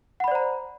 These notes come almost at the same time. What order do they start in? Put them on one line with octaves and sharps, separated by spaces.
F#5 B5 D5 C5 A#5